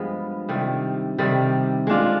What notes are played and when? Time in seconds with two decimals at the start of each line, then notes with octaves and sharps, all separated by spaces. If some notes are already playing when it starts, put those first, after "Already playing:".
Already playing: G2 F3 G#3 B3
0.49 C3 D#3 G3
1.18 C3 D#3 G3
1.87 G#3 D4 F4